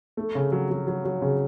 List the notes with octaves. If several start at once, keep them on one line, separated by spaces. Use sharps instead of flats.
A3
C#3
F#3
F#3
F#3
F#3
C#3